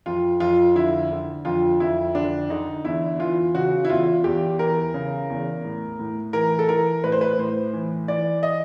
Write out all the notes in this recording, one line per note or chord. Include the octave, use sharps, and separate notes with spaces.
F2 F4
F2 F4
D3 E4
D3
F2 F4
F2 E4
D3 D4
D3 D#4
E2 E4
E3 F4
C#3 F#4
E4
E2 F4
E2 G4
E3 A#4
C#3
E2
A2
A2
E3 A#4
A4
E3 A#4
A2 B4
C5
B4
A2 C5
E3
E3 D5
D#5